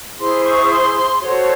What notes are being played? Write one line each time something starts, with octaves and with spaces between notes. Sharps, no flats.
E4 G#4 C5 C6
C#6
C6
F#4 A4 C5 C#5